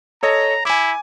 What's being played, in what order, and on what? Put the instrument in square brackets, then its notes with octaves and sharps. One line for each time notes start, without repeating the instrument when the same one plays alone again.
[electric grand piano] A4 C#5 D#5 [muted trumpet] A#5
[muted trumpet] E4 [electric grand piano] G#5 D6